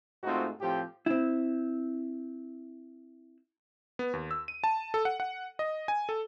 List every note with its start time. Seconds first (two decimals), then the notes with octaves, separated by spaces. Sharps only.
0.24 G#2 A3 C4 D#4 F4 F#4
0.61 A2 F3 C4 G4
1.06 C4 E4
3.99 B3
4.13 D#2
4.31 E6
4.48 D#7
4.64 A5
4.94 A4
5.05 F#5
5.20 F#5
5.59 D#5
5.88 G#5
6.09 A4